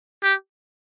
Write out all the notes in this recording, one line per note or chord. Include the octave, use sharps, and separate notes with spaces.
G4